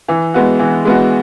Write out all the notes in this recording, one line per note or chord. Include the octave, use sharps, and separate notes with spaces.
E3
G#3 B3 F#4
E3
G#3 B3 F#4